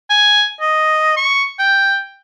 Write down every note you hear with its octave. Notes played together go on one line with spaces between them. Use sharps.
G#5
D#5
C#6
G5